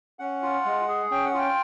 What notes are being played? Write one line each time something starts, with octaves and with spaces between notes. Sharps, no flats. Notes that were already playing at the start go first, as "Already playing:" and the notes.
C#4 F#5
F4
G#3
G#4
C#4 G5
F#5
F4 G5